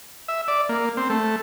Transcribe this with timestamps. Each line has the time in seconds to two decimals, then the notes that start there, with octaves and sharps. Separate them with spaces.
0.28 E5
0.48 D5
0.69 A#3
0.97 C4
1.10 A3